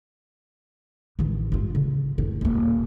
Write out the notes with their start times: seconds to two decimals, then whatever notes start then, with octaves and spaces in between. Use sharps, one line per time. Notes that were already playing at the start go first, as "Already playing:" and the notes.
1.19 A1 D#3
1.52 G2 F4
1.75 C#3
2.18 F2 A2
2.41 D#1 A#3